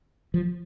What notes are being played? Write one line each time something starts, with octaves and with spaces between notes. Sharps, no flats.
F3